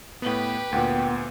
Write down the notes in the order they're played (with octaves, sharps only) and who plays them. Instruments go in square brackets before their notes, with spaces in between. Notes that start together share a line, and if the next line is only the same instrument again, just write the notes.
[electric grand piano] A2 B3 [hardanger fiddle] G4 B4
[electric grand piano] D2 A#2 [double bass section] B3 [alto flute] G5